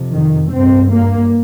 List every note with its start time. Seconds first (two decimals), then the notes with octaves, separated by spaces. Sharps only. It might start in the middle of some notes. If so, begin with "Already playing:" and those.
Already playing: F2 C3
0.12 D#3
0.52 G2 C4
0.91 A#3